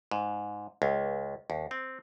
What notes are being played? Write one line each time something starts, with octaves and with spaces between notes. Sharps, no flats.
G#2
C#2
D#2
C4